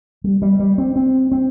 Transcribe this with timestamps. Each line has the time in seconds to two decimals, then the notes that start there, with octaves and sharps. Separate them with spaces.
0.24 G3
0.42 G3
0.60 G3
0.78 C4
0.96 C4
1.32 C4